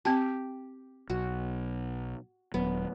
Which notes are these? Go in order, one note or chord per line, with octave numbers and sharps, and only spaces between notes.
C4 G4 A5
B1 F#4
D#1 F#3 B3